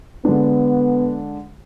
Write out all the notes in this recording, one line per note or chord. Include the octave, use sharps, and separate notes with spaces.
D3 G#3 B3 D4